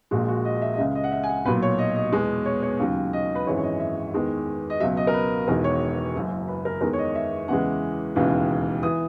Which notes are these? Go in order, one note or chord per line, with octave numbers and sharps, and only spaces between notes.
A#1 A#2 G#3 F#4
F#4
D#5
D#5
E5
D#5
C#2 C#3 G#3 E5
D#5
F#5
E5
G#5
F#5
B1 A#2 F#3 B4
C#5
D#5
D#5
E2 B2 G#3
C#5
C#5
D#2 C#3 F#3
D#5
B4
G#1 F#2 E3 G#3 C#5
C#5
D#5
E5
E2 D#3 G#3
D#5
C#2 B2 F#3 E5
D#5
A#4
B4
E1 E2 D#3 G#3 A#4
C#5
F#1 F#2 C#3
B4
A#4
E2 D#3 G#3 A#4
C#5
D#5
E5
E2 C#3 E3 G#3 F#5
E1 D#2 C#3 E3 G#3
E3 D#6